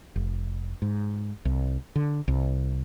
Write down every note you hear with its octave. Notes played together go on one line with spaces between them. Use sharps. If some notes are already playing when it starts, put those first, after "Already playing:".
F1
G#2
C2
D3
C2